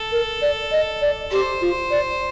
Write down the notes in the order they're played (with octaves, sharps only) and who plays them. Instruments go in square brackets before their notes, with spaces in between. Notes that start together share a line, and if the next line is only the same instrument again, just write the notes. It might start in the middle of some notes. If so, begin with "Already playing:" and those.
Already playing: [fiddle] A4
[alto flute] A#4
D5
D#5
D5
[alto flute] G4 [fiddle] C5
[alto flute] F4
D5